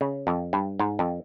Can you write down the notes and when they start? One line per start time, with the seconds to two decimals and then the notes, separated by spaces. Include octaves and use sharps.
0.01 C#3
0.27 F2
0.53 G2
0.79 G#2
0.99 F2